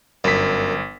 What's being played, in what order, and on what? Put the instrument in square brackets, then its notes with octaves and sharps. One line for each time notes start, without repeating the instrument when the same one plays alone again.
[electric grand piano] G1 B6 [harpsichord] F#2